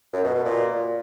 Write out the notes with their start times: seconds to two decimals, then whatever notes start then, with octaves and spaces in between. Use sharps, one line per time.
0.13 F#2
0.24 B2
0.34 B2
0.45 A#2